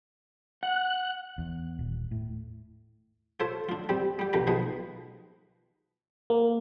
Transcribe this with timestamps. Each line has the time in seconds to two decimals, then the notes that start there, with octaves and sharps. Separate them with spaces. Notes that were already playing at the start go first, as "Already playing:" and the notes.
0.63 F#5 F#6
1.38 E2
1.79 D#1
2.11 A2
3.40 F4 A4 C5 C#5 E5
3.69 D4 F4
3.89 G3 C4 G4
4.19 G3 G4
4.33 A#1 B2 D3 A#3 G4 A#5
4.47 B2 D#3 F3 G#3 B4
6.30 A#3